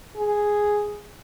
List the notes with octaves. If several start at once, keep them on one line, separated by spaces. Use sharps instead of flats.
G#4